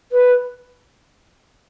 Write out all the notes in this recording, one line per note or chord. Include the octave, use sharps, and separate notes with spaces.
B4